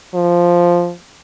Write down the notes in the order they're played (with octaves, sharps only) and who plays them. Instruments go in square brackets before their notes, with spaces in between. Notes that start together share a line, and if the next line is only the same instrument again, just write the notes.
[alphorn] F3